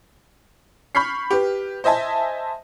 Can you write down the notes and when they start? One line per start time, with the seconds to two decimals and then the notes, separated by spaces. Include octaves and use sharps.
0.95 B5 C#6 F6 G6 B6 C7
1.30 G4 B4
1.84 C5 D#5 E5 G#5 A5